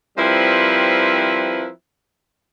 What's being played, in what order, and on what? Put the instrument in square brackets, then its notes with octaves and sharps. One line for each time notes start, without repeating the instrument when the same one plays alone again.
[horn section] F3 G3 C4 E4 A#4 B4